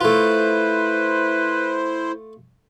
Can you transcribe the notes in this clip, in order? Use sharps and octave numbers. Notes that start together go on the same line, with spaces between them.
A3 E4 F4 B4 C5